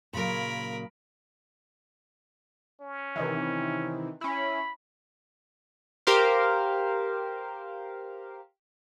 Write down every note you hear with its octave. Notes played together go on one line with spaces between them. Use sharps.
A#2 C#3 F#3 A#4 B5
C#4
C3 D#3 E3
C#4 E4 B5
G4 A#4 C5 F5